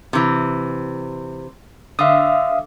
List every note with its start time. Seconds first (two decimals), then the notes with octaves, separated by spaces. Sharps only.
0.13 C3 E3
1.99 D3 E5 F5 D#6